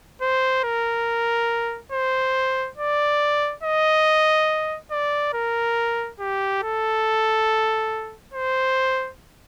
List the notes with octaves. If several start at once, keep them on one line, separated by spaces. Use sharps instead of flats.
C5
A#4
C5
D5
D#5
D5
A#4
G4
A4
C5